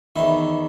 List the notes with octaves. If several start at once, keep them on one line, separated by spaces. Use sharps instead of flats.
E2 D#3 E4